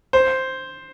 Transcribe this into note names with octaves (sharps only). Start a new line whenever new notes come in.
C5